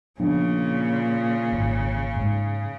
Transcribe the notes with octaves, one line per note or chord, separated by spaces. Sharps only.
A#2 C#3 F3 B3 D4
G#1
G#2